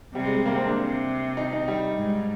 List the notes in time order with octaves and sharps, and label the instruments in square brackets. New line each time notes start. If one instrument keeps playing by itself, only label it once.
[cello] C3 [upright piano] G3
[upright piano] G#3
G#3
A#3
C4
D4
[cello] C3
[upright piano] D#4
D#4
G3
[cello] G#2